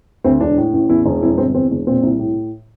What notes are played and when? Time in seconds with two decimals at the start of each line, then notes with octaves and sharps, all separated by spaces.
0.24 D2 C4
0.41 E1 D4
0.58 A2
0.73 A1
0.89 E2 E4
1.06 E1
1.22 F2 E4
1.38 G1 C4
1.54 E2 C4
1.71 E1
1.87 A#2 C4
2.03 C2
2.19 A2